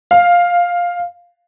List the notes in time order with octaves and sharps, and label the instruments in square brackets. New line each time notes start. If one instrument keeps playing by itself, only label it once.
[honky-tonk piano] F5